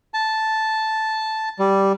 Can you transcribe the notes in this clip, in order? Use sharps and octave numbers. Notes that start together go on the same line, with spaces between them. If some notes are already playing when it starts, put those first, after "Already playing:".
A5
G3